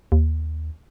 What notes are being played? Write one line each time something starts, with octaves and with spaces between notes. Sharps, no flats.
D#2